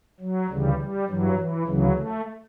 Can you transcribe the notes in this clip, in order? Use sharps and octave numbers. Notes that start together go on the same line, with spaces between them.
F#3
D2 C#3 E3 G3
G3
G2 E3 F#3
E3
D2 C#3 E3 F#3
A3